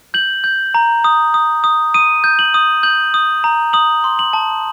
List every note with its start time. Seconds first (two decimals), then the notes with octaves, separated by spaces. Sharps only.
0.14 G6 F#7
0.44 G6
0.74 A#5
1.04 D#6
1.34 D#6
1.64 D#6
1.94 D#6 D#7
2.24 G6
2.39 F#7
2.54 D#6
2.83 G6 F#7
3.14 D#6
3.44 A#5
3.73 D#6 F#7
4.04 C6
4.19 F#7
4.33 A5